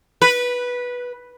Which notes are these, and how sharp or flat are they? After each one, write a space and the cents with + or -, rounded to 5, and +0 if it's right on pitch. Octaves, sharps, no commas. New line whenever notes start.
B4 -10